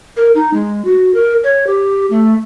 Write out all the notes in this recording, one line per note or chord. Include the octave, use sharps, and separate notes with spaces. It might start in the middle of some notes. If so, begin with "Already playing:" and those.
A#4
D#4
G#3
F#4
A#4
C#5
G4
A3